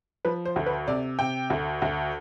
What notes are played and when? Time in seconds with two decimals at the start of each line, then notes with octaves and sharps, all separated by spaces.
0.25 F3 B4
0.45 C5
0.56 D2
0.66 B4
0.88 C3 D5
1.19 C3 G5
1.50 D2
1.82 D2